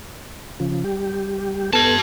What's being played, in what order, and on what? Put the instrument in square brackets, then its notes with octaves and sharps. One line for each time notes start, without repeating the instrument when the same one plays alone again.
[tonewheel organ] C#3 F3
G3 G4
[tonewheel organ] B3 A4 [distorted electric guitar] G4 A5